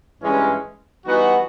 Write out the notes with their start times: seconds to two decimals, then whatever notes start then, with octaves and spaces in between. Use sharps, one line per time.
0.20 G2 E3 G#3 C#4
1.06 E3 G3 B3 D#4 F#4